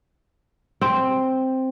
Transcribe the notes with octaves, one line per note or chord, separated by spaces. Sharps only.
C4